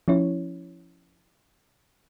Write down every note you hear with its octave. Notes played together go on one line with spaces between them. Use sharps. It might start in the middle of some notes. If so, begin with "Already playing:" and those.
F3 C#4 E4 C#5